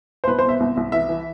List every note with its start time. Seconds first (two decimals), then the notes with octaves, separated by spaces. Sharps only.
0.24 C5
0.27 C2 B4
0.39 B2 C5
0.49 E5
0.60 C2
0.77 C2
0.92 E3 E5
1.09 E3